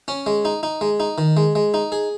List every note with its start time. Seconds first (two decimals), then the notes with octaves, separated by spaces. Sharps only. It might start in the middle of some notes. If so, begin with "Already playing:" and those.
0.08 C#4
0.26 G#3
0.45 D#4
0.63 D#4
0.81 G#3
1.00 D#4
1.18 D#3
1.37 G#3
1.55 G#3
1.74 D#4
1.92 G#4